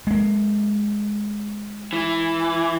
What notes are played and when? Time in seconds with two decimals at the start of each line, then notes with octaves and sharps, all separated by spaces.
0.07 G#3 A#3
1.93 E3